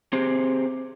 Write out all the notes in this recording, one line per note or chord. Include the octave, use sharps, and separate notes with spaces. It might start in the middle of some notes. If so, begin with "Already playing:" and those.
C4 G4 G#4 C5